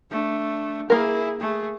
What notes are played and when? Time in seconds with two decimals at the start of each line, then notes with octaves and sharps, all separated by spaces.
0.10 A3 D4
0.90 A#3 E4 G#4 A#4
1.40 A3 G#4